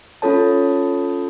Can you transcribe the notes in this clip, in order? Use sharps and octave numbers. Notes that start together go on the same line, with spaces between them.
C#4 F4 A4 C#5 A5